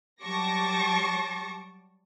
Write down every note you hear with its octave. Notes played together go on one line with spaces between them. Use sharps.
F#3 G3 A5 C#6 D6 A#6